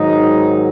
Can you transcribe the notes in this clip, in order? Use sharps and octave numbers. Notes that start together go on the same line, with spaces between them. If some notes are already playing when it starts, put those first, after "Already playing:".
Already playing: G#2 D#3 F#3 D#4